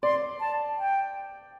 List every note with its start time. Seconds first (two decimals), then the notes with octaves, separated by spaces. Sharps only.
0.03 D5 C6
0.40 A5
0.78 G5